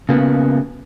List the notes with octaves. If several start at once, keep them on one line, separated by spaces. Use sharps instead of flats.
C#3 A#3 B3